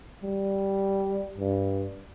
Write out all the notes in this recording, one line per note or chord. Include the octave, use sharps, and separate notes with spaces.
G3
G2